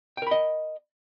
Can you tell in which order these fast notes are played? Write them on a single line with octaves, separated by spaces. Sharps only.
G5 A#4 B5 D#5